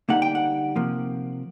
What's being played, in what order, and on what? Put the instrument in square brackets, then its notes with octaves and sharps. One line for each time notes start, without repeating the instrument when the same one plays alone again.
[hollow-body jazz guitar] D3 G3 A#3 D#4 F#5
G5
F#5
C3 F3 A#3